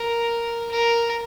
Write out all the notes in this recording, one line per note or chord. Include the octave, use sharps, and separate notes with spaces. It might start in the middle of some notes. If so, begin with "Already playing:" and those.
Already playing: A#4
A#4